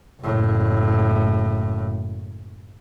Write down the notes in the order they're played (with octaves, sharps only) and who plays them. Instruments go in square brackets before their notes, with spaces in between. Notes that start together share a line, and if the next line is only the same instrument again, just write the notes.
[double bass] F#1 A2